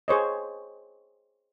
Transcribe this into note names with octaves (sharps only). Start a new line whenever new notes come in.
G#4 C5 C#5 D#5